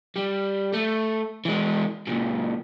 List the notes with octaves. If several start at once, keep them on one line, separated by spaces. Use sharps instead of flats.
G3
A3
E3 G#3
C#2 A#2